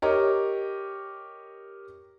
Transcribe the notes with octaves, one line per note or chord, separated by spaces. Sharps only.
G4 A#4 C#5 D#5